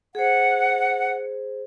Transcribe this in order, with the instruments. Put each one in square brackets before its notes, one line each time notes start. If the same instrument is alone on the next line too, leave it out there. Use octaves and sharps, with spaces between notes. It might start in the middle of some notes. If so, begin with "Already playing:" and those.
[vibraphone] G#4 C5 [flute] F#5